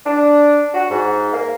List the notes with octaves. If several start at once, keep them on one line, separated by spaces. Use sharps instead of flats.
D4
F#4
G#2
A#3